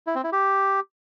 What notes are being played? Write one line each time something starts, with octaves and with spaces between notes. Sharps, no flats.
E4
C4
E4
G4